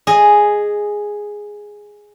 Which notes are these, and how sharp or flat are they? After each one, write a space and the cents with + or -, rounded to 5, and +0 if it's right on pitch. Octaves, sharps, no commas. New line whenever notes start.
G#4 +0 D#5 -5